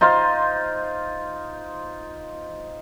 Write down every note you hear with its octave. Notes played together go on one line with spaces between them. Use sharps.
D#4 F4 C5 F5